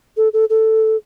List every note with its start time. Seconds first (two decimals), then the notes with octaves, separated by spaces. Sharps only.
0.17 A4
0.33 A4
0.50 A4